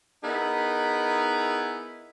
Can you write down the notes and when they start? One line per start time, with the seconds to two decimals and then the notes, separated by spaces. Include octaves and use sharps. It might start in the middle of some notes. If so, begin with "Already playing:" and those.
0.24 B3 D#4 E4 G#4 A#4